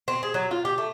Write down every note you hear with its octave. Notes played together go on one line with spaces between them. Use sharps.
C4
G#4
F#3
F4
G4
A3